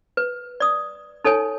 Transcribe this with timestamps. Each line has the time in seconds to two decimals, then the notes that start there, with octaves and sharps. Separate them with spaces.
0.17 B4
0.60 D5 D#6
1.24 D#4 A4 C#5 G#5